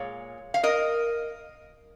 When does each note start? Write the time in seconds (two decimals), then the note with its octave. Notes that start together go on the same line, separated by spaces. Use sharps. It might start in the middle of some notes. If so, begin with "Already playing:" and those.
Already playing: A#2 G#3 C#5 F5
0.54 F5
0.63 A#4 D#5